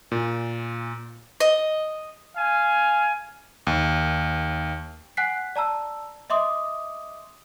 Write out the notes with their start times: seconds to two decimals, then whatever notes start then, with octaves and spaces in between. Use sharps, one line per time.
0.12 A#2
1.40 D#5
2.37 F5 G#5
3.67 D#2
5.17 F#5 G#5 F#6 B6 C7
5.56 D5 A5 A#5 E6
6.30 D#5 E5 C6 D6 D#6